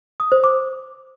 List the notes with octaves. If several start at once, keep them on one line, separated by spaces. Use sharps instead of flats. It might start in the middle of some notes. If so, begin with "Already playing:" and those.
D#6
C5
D6